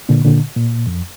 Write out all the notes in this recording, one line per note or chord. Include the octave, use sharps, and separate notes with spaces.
A#2 D3
A#2 D3
A#2
F2